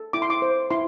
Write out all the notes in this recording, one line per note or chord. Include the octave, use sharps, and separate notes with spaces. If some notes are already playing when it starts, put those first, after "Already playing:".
Already playing: A4
E4 D6
C6
D6
C5
E4 C6